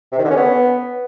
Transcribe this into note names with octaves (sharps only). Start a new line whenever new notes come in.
C3
D#3
D3
C#4
B3